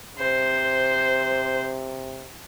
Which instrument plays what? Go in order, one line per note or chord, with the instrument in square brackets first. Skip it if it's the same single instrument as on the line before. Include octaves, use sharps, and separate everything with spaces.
[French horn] C3 [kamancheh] C5